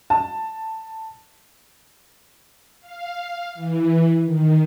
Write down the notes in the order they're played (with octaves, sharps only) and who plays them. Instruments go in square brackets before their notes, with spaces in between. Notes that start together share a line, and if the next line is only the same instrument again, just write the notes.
[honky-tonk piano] A5
[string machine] F5
E3
D#3